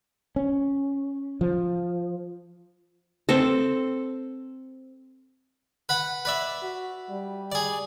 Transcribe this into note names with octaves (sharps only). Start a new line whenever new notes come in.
C#4
F3
C4 A4
B4 F#5 B5
B4 D5 E5
F#4
G3
G#4 D5